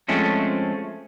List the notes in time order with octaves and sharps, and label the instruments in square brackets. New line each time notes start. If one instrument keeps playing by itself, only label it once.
[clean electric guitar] F3 G#3 A3 C4 C#4